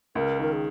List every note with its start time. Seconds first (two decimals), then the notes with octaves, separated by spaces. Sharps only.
0.15 C#2 A#4
0.39 D#3 A#4
0.52 G#4